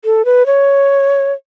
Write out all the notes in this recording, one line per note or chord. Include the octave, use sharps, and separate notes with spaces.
A4
B4
C#5